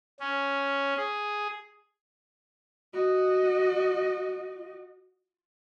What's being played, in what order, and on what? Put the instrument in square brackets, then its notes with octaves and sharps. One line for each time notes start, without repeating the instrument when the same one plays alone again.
[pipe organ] C#4
G#4
[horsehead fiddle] F#4 D#5